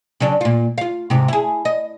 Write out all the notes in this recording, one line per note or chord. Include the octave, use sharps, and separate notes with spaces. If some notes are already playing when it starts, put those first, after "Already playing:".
C#3 F#3 D4
A#2 F4
F4 F5
G#2 C3
E4 G#4
D#5